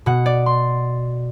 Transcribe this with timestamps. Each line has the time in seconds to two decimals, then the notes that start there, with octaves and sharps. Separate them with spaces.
0.06 B2 F#5
0.26 D5
0.46 C6